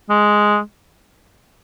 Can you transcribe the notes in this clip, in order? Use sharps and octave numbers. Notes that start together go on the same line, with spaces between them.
G#3